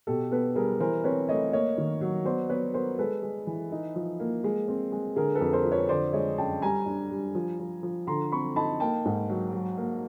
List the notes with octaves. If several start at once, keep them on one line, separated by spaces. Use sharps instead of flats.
B2 G4 A4
B3 A4 B4
G3 G#4 A#4
E3 A#4 C5
C4 B4 C#5
A3 C#5 D#5
A#3 C#5 D#5
D#3
F#3
B3 C5 D5
B3 B4 C#5
B3 A#4 C5
G#3 A4 B4
G#3
E3
D#4
F3
A#3
G#3
C4
G#3
D3 G#4 A#4
A4 B4
F2
A#4 C5
F3
B4 C#5
D3 C5 D5
G#3 C#5 D#5
F#2 G5 A5
G3 G#5 A#5
D4
G3
F3
F3
F3
D3 A#5 C6
C4 B5 C#6
D#4 A5 B5
A#3 G5 A5
G#2
F#3
F#3
A#3